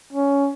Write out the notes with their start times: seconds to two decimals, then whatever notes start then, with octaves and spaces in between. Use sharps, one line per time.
0.13 C#4